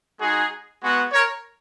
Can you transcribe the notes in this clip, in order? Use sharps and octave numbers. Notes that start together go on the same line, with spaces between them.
G#3 D#4 F#4 G#4
G#3 B3 F#4
A#4 C#5